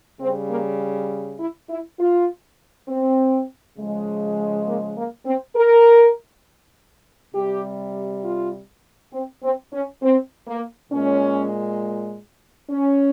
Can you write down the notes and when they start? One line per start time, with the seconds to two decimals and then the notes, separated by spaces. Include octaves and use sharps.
0.20 C#3 G3 C4
0.51 A#3
1.39 E4
1.70 E4
1.99 F4
2.88 C4
3.78 C#3 F3 G#3
4.67 A#3
4.97 A#3
5.26 C4
5.56 A#4
7.35 C3 G3 G4
8.24 F4
9.13 C4
9.43 C4
9.73 C#4
10.03 C4
10.47 A#3
10.92 A#2 G#3 C#4
12.70 C#4